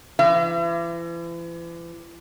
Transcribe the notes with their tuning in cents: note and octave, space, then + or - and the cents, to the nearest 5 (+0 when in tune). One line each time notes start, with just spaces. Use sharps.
E3 +40 E5 +40